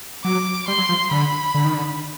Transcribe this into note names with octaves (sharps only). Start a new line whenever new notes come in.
F#3 D6
G3 C6
F#3
F3
D3 B5
D3
D#3
D3